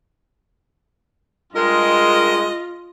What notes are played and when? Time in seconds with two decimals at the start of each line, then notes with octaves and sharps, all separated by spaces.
1.56 G2 G#3 F4 A#4 D#5